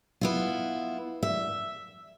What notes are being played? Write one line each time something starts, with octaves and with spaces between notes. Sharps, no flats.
B3 E4 F4
E5